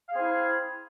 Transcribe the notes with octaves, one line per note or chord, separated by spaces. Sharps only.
C4 E4 G#4 F5